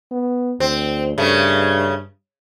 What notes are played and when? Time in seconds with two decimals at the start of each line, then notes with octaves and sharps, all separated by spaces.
0.12 B3
0.60 D2 C4
1.18 G2 C#3 A3